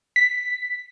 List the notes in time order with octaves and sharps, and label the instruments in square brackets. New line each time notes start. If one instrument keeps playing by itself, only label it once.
[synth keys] B6